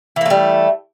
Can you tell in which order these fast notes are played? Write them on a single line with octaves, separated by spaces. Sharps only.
E3 A#3 A3 G3